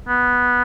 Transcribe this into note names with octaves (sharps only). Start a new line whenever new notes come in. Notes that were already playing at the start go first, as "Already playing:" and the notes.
B3